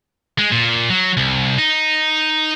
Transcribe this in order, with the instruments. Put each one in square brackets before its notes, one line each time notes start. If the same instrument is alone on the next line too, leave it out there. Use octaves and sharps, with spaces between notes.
[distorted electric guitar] G#3
A#2
F#3
C2
D#4